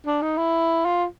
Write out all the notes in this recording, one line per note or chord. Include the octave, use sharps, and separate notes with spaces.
D4
D#4
E4
F4